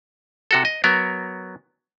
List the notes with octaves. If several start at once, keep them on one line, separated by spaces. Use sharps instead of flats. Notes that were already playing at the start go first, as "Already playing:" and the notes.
C3 F#4 A4
D#5
F#3 B3 A#4